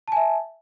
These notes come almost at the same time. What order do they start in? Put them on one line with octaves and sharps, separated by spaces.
A5 G#5 E5